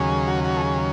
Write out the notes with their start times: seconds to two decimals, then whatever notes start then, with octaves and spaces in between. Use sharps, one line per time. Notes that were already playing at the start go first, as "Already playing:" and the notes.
Already playing: D#2 C#3 F#3 C#4 G#4
0.28 F#4
0.44 F#4
0.57 A4
0.61 G#4